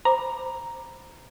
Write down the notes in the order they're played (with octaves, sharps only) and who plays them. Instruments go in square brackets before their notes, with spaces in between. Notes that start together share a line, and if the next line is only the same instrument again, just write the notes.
[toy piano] C5 B5 D6 [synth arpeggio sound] A#5